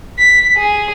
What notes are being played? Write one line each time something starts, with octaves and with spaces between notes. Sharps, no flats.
B6
G#4